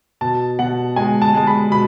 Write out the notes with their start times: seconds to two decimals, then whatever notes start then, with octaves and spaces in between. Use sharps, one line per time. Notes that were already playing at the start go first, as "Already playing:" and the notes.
0.21 B2 A5
0.59 B2 F#5
0.96 G#3 G#5
1.22 A5
1.34 G#3 A5
1.47 B5
1.71 B2 B5